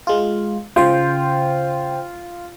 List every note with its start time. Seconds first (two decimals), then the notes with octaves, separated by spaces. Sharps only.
0.07 G#3 F4
0.76 C#3 F4 C5 G5